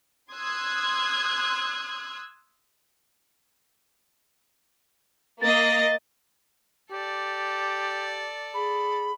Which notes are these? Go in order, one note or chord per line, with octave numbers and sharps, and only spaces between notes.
C6 D#6 E6 F#6 G#6
A#3 D#5 A6
G4 A4 D5
G#4 B5